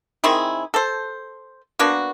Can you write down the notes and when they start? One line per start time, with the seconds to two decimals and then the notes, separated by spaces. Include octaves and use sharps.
0.24 D#3 C4 E4 G#4
0.74 A4 C5
1.79 A#3 B3 D4 F#4